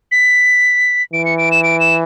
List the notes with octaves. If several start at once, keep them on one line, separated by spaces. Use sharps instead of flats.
B6
E3 D7
C#7
D7
E7
D7
E7